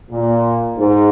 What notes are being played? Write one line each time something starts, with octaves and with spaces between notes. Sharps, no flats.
A#2
G#2